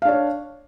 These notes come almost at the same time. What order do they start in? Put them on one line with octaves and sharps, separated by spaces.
F5 D4 C#5